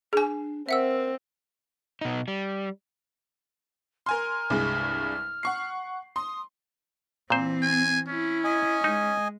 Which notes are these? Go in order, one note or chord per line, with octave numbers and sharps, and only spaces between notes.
D4 G#4 G#5
C4 A#4 E5 F#5 E6
B2 D#4
G3
A#4 G#5 C6 F6
C2 G2 G#3
F#5 C#6 C7
C6 D#6
A#2 E3 C4 C5
G#5
C#4 E4
D#5 G#5
G#3 D#4